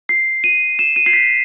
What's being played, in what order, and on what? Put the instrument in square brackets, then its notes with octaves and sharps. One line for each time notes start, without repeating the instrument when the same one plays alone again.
[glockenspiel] C7
D#7
E7
D#7
C7
B6